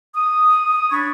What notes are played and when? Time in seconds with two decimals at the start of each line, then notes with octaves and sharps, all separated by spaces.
0.14 D#6
0.91 D4 C#5 B5 C#6